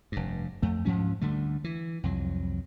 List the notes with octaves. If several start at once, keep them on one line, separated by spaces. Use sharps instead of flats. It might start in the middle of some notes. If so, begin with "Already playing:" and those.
F1 G2
F2 A3
D2 G#2 F3 C#4
D2 D3 G3 A3
E3
C2 F2 F#3